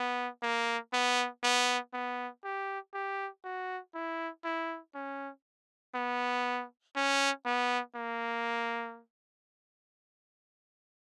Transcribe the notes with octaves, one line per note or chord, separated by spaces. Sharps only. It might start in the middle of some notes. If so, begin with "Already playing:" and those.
Already playing: B3
A#3
B3
B3
B3
G4
G4
F#4
E4
E4
C#4
B3
C#4
B3
A#3